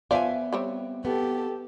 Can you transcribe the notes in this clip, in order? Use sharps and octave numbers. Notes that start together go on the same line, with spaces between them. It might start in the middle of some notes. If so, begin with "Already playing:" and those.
F3 B3 D5 E5 G#5
G3 C4 C#5
B3 G4 A4